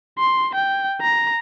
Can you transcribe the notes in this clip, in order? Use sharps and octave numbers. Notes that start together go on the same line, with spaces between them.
C6
G5
A#5